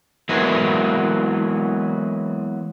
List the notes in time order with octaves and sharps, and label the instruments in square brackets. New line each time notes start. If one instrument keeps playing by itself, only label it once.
[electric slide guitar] E3 F#3 G#3 A#3 B3 E4